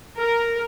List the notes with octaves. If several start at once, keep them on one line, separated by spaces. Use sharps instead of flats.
A#4